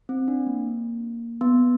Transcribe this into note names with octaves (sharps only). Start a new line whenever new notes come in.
C4
D4
A#3
B3